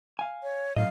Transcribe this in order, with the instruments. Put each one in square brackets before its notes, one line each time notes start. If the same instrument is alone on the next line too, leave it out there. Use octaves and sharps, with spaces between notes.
[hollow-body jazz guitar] F5 G#5
[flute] C#5
[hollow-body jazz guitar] F#2 D#5 [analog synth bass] A2 [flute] F5